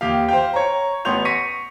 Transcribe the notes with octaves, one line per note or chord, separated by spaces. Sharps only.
D#2 G4 F5
C5 F5 G5
C#5 A#5
A1 B3 C#5 C6 G6 F7
C#6 A#6 B6 C#7 D#7